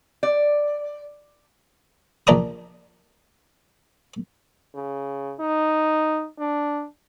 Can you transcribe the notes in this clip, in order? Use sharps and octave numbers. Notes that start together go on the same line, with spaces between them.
D5
A#1 D4 A#5 D#6
C#3
D#4
D4